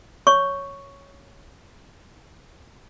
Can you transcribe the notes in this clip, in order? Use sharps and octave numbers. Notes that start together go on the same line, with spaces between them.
C#5 C#6